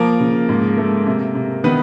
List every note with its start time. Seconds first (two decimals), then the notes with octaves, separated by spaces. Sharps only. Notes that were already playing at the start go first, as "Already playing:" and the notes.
Already playing: F3 A#3 A#4
0.20 C#3
0.49 G#2
0.78 A3
1.07 C3
1.35 C3
1.64 D#3 B3 B4